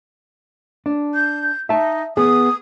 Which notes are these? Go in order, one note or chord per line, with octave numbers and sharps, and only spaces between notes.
D4
G6
D#4 E5 A5
B3 G#4 D#6